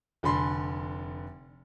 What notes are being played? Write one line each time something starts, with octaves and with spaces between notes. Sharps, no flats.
F1 D3 G#5 B5 C6